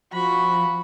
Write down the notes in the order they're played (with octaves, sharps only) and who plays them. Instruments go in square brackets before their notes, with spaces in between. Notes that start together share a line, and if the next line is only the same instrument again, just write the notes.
[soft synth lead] F3 [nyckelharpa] F#4 C#6 [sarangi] B5